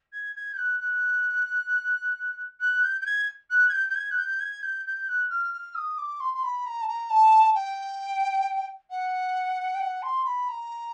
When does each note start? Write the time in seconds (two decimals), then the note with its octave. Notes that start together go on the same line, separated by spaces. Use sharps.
0.13 G#6
0.36 G#6
0.53 G6
0.57 F#6
0.80 F#6
2.60 F#6
2.83 G6
3.01 G6
3.06 G#6
3.50 F#6
3.69 G#6
3.73 G6
3.90 G6
3.95 G#6
4.11 F#6
4.18 G6
4.40 G#6
4.63 G6
4.86 G6
5.08 F#6
5.30 F6
5.53 F6
5.75 D#6
5.98 D6
6.20 C6
6.34 C6
6.43 B5
6.66 A#5
6.82 A5
6.88 A#5
7.10 A5
7.55 G5
8.90 F#5
9.74 G5
9.80 F#5
10.02 C6
10.25 B5
10.48 A#5